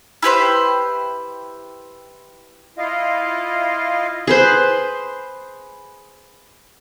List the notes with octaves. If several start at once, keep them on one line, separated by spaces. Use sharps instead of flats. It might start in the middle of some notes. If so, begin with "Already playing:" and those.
E4 G4 B4 C5
E4 F4 D#5 F5
G#4 B4 C5